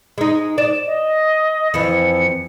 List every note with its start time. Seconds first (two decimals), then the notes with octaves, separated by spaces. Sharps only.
0.18 G#3 D#4
0.58 D5 E7
0.87 D#5
1.74 F2 E3 C#7